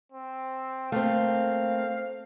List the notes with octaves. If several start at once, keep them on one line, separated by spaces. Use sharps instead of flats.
C4
A3 A#3 C4 F5